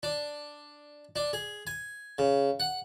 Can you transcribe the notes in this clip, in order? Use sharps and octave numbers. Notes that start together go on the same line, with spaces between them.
D4
D4
G#4
G#5
C#3
F#5